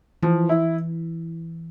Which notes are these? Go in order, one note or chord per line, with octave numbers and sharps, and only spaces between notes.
E3 F3
E4